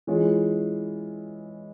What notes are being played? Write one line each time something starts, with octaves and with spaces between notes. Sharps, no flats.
E3 G#3 C#4 F4